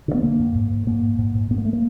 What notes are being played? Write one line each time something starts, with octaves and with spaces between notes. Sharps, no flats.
D3
B3
D3 A#3
F#2
G#2
G#2
G#2 A#3
G#2
G#2
G#2
G#2 B3
A#3
A3
A#3